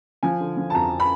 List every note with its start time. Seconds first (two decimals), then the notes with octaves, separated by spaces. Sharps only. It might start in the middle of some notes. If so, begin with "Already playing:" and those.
0.23 F3 G#5
0.40 D3
0.57 F3
0.70 A5
0.74 F2 A#5
1.00 B5